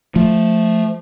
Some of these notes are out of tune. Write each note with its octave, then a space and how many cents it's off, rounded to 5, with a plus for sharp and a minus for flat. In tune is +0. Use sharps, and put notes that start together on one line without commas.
F3 +0 A3 +0